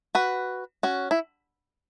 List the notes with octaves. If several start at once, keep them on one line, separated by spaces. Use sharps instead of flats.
F#4 B4
C#4 F#4
E4